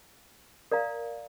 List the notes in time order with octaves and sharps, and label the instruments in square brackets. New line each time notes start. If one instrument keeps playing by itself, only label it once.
[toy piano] A#4 D5 F5 A#5